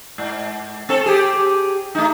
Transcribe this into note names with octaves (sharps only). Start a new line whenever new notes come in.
G#2
C4 A4
G4 G#4
A3 D#4